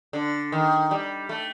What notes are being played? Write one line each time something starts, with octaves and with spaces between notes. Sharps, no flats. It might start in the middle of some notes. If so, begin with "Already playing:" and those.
D3
D#3
G3
A3